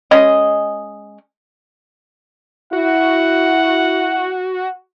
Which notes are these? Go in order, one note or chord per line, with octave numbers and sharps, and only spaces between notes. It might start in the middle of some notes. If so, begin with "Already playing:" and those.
G#3 C#4 D#5
E4 F#4 F#5